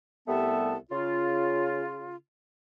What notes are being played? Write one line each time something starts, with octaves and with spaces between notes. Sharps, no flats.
C2 G3 A3 B3 E5 A5
C#3 F4